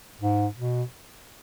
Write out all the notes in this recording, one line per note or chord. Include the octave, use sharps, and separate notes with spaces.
G#2
B2